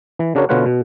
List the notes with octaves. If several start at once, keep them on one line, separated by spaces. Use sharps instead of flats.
E3
C#3 D4 F#4 A#4 C#5
B2 D3 F4 B4 C#5 F#5
B2